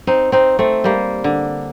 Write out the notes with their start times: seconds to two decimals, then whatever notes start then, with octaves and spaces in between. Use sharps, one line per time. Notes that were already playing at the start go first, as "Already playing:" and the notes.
0.07 C4 D#4
0.32 C4 D#4
0.59 A3 C4
0.84 G3 A#3
1.24 D3